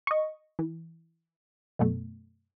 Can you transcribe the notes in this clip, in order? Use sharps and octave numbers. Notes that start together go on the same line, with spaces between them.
D#5 C#6
E3
F#2 B2 A3